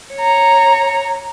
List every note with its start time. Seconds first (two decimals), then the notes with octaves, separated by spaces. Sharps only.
0.15 C#5 A#5